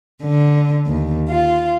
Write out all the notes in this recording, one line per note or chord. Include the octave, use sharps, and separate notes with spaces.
D3
D#2
F4